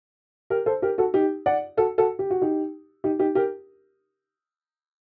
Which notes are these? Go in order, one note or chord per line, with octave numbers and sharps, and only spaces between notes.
G4 A#4
A4 C5
G4 A#4
F#4 A4
D#4 G4
D5 F#5
F#4 A4
F#4 A4
G4
F#4
D#4 G4
D#4 G4
D#4 G4
G4 A#4